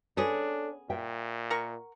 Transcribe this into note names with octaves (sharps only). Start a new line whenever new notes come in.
B3 C#4 D4 G#4 A4 C#5
A#2 E5 G5
A#4 F#5 C#6